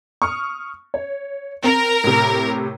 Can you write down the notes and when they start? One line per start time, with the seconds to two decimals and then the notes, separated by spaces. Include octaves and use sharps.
0.22 C#6 D#6 F6
0.94 C#5
1.64 C4 A#4
2.04 A2 C3